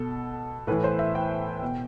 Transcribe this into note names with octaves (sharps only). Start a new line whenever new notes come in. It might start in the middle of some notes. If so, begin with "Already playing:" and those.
Already playing: B2 A4
A2 E3 B4
C5
E5
G5
B2